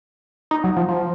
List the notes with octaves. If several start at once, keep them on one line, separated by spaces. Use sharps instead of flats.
D#4
F#3
F3
F3